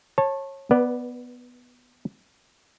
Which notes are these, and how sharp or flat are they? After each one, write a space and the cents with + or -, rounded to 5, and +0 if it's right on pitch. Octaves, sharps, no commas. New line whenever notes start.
C#5 -25 A5 +0
B3 +0 B4 -25 D5 +10